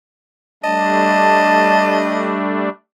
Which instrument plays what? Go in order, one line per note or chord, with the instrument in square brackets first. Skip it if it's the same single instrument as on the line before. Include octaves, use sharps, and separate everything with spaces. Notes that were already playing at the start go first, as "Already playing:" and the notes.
[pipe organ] G3 A3 D4 [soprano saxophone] D#5 [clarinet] A5